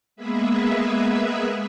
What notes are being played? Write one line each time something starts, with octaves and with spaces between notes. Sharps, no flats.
G#3 A#3 B3 G#4 B4 E5